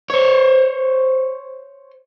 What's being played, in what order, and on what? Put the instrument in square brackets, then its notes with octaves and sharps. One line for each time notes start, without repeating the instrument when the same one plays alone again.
[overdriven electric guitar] C5 C#5